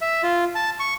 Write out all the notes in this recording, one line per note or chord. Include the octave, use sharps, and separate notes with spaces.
E5
F4
A5
C#6